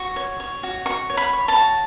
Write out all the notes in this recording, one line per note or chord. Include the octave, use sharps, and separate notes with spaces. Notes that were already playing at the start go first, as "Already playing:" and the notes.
Already playing: F#4 C#6
C#5
C#5
F#4
F#4 C#6
C#5
B5
C#5
A5
F#4